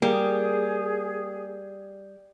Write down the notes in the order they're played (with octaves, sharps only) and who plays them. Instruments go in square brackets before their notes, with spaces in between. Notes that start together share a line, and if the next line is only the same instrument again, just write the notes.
[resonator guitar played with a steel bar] G3 [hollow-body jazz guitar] A#3 [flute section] G#4